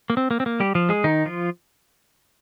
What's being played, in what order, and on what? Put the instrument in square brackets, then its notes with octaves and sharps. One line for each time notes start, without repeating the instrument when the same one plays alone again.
[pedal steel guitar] A#3
C4
A#3
C4
A#3
G3 G4
F3 F4
G#3 G#4
D#3 D#4
F3 F4